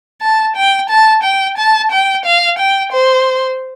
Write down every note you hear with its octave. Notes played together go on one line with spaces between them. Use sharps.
A5
G5
A5
G5
A5
G5
F5
G5
C5